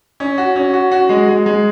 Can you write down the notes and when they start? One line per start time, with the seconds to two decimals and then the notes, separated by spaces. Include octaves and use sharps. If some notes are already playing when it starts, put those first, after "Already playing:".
0.20 C#4
0.38 F#4
0.56 C#4
0.73 F#4
0.91 F#4
1.09 G#3
1.28 G#3
1.46 G#3